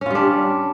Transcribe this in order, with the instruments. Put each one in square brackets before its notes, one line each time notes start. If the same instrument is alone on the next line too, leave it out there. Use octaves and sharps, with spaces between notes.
[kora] C#4
F4
G3
D4